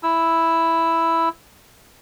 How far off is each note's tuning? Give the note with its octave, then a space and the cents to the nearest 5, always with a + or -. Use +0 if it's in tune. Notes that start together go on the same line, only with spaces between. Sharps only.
E4 +0 E6 +0